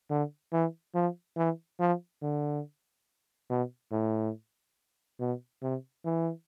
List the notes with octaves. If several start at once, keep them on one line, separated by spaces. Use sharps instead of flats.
D3
E3
F3
E3
F3
D3
B2
A2
B2
C3
E3